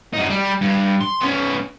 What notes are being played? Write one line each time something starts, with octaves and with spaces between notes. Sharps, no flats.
F#2 D#4
G3
G2
C6
B3 C#4